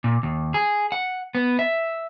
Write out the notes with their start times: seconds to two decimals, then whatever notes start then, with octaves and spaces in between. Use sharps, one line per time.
0.04 A#2
0.23 D#2
0.54 G#4
0.92 F#5
1.35 B3
1.59 E5